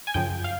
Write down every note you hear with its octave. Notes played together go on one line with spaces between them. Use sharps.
G#5
F#2 C#3 F3 G5
F5